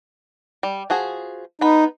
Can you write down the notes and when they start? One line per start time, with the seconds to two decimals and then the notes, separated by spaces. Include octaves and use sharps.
0.63 G3
0.90 F3 F#4 G#4
1.61 B3 D#4 B5